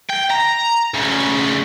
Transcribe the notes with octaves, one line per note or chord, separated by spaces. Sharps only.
G5
A#5
D2 C#3